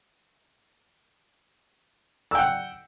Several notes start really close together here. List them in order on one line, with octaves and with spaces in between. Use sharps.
E6 G5 F#5